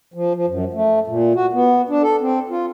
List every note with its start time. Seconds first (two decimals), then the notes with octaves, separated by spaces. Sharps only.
0.14 F3
0.34 F3
0.47 F#2
0.74 A3
1.07 A#2
1.35 F#4
1.53 B3
1.89 D4
2.02 A4
2.21 C4
2.50 F4